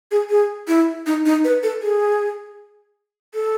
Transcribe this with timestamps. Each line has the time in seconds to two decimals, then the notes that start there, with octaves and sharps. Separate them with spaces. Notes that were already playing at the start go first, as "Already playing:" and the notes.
0.11 G#4
0.30 G#4
0.68 E4
1.06 D#4
1.26 D#4
1.44 B4
1.63 A4
1.82 G#4
3.34 A4